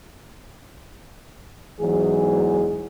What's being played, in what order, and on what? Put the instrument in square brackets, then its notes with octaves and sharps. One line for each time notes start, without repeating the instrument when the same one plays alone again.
[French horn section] E2 G#2 E3 F#3 G#4